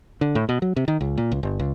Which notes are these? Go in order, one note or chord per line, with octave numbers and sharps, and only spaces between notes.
D3
A2
B2
F#3
C3
D#3
C#2
A#2
C#2
G1
C#2